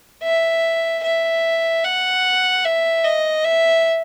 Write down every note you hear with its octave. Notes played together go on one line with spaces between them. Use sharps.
E5
E5
F#5
E5
D#5
E5